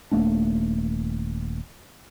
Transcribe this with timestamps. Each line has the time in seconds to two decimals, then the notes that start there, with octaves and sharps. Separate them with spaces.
0.11 D#1 A3 A#3 D4